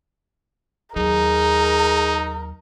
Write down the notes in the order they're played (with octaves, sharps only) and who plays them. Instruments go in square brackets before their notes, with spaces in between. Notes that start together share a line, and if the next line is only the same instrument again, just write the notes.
[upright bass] D#2 F#3 [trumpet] D#4 [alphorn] G#4 [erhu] A#4